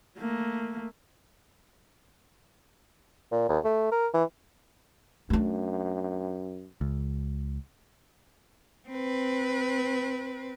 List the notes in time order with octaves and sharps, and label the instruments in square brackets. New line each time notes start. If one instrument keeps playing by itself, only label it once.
[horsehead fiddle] A3 A#3
[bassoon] A#2
D#2
A3
A#4
E3
[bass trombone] F#2 [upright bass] A3 D4
[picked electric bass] C#2
[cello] C4 B4